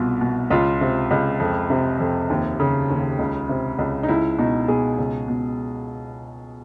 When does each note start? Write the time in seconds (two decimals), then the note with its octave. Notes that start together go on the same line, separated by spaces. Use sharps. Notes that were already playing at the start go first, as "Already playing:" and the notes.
Already playing: C2 B2 F4
0.21 B2
0.51 C#2 F4
0.81 C3
1.11 C#2
1.40 F2
1.70 C3
2.00 F2
2.30 D#2
2.60 C#3
2.90 D#2
3.19 C#2
3.49 C3
3.79 C#2
4.03 D#4
4.08 C#2 E4
4.38 B2 D#4
4.68 B2 G#4
4.98 C#2
5.28 B2